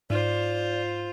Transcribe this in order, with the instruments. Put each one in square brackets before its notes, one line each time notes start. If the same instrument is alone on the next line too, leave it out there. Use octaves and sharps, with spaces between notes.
[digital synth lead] G#2 [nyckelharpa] F4 C5 [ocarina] D5